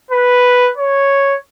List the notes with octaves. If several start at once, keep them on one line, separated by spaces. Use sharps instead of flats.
B4
C#5